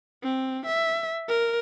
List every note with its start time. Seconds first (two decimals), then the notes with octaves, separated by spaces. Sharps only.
0.23 C4
0.66 E5
1.28 A#4